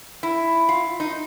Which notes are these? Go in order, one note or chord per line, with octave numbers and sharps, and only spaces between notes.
E4
F4
D#4